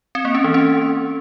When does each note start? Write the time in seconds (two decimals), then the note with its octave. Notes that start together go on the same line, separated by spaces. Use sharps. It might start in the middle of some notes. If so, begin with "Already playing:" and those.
0.15 C4
0.25 A#3
0.35 C#4
0.44 E3
0.54 C#4